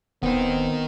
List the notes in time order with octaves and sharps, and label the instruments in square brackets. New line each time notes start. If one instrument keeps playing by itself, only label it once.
[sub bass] D1 [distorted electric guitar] D#3 D#4 [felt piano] B3 [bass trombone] C4